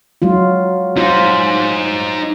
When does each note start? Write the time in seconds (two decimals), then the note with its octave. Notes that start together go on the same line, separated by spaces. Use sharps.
0.22 F#3 G#3 F4
0.97 D#4 F4 C5